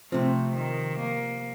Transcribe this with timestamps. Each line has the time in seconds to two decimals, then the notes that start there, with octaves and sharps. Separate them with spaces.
0.12 C3 F3 A3 C4
0.55 D#3
0.99 A#3